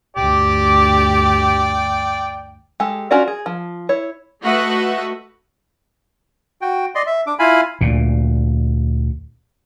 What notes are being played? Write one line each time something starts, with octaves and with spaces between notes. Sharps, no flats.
D2 G2 G4 D5 G5
G#3 G4 A4
C#4 F4 F#4 A#4 D5
G#4
F3
E4 C#5
A3 F#4 B4 D#5 E5 F#5
F#4 G5
D5 D#5 C6
E5
D4 D6
E4 F4 F5 G#5 B5
D2 A#2